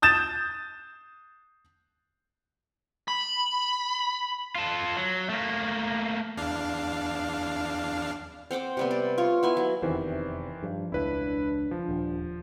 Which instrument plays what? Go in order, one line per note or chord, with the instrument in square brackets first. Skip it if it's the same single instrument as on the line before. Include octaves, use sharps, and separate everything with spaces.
[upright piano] D#6 G6 A6 E7
[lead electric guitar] B5
[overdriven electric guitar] F4 A4
F#3
A3 A#3
[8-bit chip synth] E2 D4 F5
[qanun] C4 F#5 G5 D6
C3 G3 B3
D5
F4 C#5
B3 E4 G#5
F#3
[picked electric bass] F1 E2 C3 [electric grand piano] D#3 E3 C5
[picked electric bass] G2 [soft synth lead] F3
[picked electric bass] E1 C#2 [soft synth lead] D4 [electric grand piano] E4 B4
[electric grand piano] F3
[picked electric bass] D#1